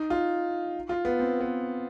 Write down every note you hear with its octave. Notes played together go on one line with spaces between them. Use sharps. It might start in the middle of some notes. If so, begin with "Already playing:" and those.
Already playing: D#4
F4
F4
B3
C4
B3